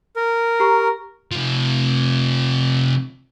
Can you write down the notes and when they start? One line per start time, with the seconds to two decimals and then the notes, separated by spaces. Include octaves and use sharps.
0.16 A#4
0.60 G4 A#5 C#6
1.32 C3 F3